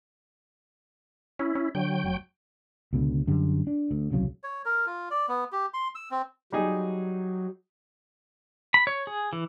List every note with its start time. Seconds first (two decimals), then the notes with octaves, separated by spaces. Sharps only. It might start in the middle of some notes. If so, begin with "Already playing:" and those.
1.39 C#4 E4
1.55 C#4
1.75 D3 F#3 G5
2.04 F1
2.93 C#2 B2 D3
3.27 F#2 D3 G3
3.67 D4
3.91 D2
4.12 D#1 C2 C#3 F#3
4.44 C#5
4.65 A#4
4.86 F4
5.11 D5
5.28 B3
5.52 G4
5.74 C6
5.95 E6
6.11 C4
6.52 F#3 G3 D#4 G#4
8.74 B5
8.87 C#5
9.07 G#4
9.33 E3